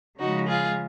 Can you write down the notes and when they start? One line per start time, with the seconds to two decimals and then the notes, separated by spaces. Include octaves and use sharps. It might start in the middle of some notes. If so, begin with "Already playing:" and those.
0.19 C#3 F3 G#3 D#4 F#4
0.47 F4 G#4